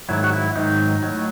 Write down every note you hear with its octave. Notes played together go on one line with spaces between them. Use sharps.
G#2 D#3 F#3 E4
F#4
E4
G#2 D#3 F#3 D#4
A2 F#3